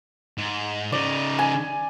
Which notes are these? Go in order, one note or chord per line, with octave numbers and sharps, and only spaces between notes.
G#2
C#3 D#4 D5
G#5